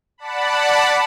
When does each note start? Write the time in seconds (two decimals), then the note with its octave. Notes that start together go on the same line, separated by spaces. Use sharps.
0.18 D5 F#5 A5 B5